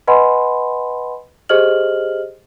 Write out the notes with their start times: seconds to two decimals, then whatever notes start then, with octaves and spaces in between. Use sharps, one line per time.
0.07 B4 D#5 F#5 G#5 B5 C6
1.49 G4 G#4 C5 D#5 F6 F#7